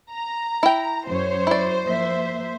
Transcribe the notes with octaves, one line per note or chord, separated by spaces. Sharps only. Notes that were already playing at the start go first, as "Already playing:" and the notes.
A#5
E4 G5
F#2 C5 C#5
E4 D5
F3 A#3 E5